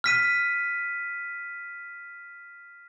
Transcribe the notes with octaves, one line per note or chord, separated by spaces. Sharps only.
F6 B6 D#7